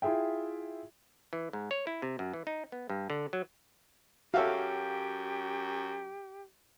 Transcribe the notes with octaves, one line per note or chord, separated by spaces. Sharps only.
E4 F4 G#4 E5 G5
E3
G#2
C#5
E4
C3
F#2
E3
D#4
B3
G2
D3
F#3
F#2 F#4 G4 A4 C#5 E5 F5